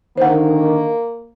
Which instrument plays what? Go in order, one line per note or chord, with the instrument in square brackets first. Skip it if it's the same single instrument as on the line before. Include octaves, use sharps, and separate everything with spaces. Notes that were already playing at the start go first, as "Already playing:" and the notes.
[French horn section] D3 D#3 [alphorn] A#3 [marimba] C5 F#5